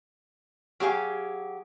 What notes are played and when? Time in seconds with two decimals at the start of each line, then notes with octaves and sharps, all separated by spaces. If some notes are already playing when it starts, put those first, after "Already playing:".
0.80 F#3 G4 G#4 F5